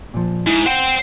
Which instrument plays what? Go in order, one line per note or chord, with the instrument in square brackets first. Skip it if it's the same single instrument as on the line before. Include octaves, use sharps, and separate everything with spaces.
[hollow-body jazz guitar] A#2 F3
[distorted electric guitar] G#2 [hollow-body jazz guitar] E4
[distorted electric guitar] C5 G5 [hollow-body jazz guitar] F#5